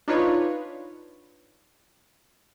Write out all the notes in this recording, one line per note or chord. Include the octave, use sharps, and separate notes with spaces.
D4 D#4 F4 B4 C#5